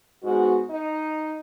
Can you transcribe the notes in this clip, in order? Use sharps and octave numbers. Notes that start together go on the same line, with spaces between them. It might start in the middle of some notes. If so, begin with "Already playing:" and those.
G#2 G#3 B3 F#4
D#4